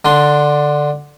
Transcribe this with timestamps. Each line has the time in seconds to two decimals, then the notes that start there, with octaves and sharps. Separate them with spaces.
0.05 D3 D4 C6